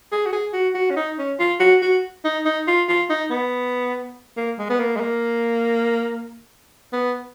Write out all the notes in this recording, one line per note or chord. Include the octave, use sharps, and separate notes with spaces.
G#4
F#4
G#4
F#4
F#4
C#4
D#4
C#4
F4
F#4
F#4
D#4
D#4
F4
F4
D#4
B3
A#3
G#3
B3
A#3
G#3
A#3
B3